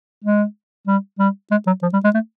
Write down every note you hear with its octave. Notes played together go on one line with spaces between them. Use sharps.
G#3
G3
G3
G#3
F#3
F3
G3
G#3
A3